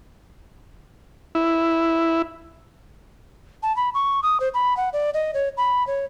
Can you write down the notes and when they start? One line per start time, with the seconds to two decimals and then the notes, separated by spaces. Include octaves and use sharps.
1.35 E4
3.63 A5
3.76 B5
3.94 C#6
4.23 D#6
4.40 C5
4.54 B5
4.77 F#5
4.93 D5
5.14 D#5
5.34 C#5
5.57 B5
5.87 C#5